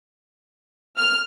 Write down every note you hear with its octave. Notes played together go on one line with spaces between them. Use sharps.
F6